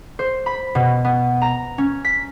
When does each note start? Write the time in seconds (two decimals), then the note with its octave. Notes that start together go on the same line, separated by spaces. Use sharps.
0.19 C5
0.46 B5
0.75 B2
1.04 B3
1.42 A#5
1.78 C#4
2.05 B6